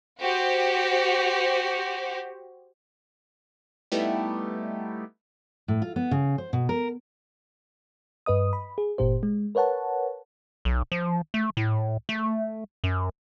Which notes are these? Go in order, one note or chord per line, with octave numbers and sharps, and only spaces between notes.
F#4 G4 C5
G3 A3 B3 D#4 E4 G4
A2
F4
B3
C#3
C5
B2
A#4
G2 B4 D#5 D#6
B5
G#4
G1 A#2 G4 C5
G#3
A#4 B4 C#5 F#5 A5
B1
F3
A3
A2
A3
F#2